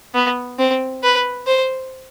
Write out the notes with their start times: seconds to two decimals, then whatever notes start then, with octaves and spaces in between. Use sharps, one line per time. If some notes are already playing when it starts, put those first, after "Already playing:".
0.14 B3
0.59 C4
1.03 B4
1.47 C5